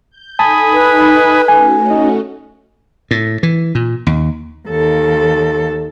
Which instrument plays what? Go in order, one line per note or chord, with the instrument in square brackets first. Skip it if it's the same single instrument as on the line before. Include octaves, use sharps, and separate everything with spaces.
[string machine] G6
[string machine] D#4 A4 [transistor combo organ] G#5 B5 D#6 [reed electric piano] A5
[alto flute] B4
[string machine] A3 C#4 F#4 [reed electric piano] G#5
[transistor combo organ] D#4
[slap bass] A2
E3
A#2
D#2
[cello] D#2 A4